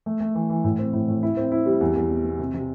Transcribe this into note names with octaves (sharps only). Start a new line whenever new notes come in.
A3
A3
E3
E3
A2
C4
A2
A2
E4
C4
E4
G3
E2
E2
B2
B2
C3
C3